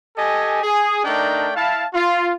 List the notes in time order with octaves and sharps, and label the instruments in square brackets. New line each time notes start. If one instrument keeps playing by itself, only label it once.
[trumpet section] G4 A4 D#5 G#5
G#4
A3 D4 D#4 A#4 D5 G5
E4 F5 A5
F4